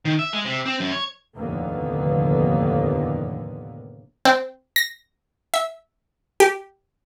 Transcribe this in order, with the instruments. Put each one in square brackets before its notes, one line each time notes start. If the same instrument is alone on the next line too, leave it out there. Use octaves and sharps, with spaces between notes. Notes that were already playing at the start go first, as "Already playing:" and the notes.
[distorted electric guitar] D#3
E5
G#3
C3
C4
F#2
C#5
[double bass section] F1 D#2 A2 D3 A#3 B3
[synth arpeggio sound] C4
A#6
E5
G4